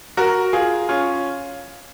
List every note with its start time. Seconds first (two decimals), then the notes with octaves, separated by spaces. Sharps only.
0.17 F#4 A#4
0.53 F4 G#4
0.89 C#4 F4